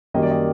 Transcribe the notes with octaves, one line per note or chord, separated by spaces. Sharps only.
F#2 D#3 G3 A#3 D#5
D5
D#5